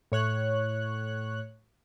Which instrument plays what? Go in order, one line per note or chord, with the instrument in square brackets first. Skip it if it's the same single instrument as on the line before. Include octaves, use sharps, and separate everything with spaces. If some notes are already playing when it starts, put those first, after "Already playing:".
[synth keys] A2 C#5 F#6